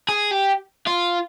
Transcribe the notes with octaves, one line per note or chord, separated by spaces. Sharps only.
G#4
G4
F4